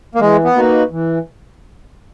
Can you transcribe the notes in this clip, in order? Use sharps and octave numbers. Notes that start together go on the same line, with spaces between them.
A#3
E3 G#3
B3
A#3 D#4 F#4 B4
E3